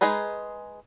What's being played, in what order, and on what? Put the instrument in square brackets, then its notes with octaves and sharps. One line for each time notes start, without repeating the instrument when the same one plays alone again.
[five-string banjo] G#3 D#4 G#4 B4 A#5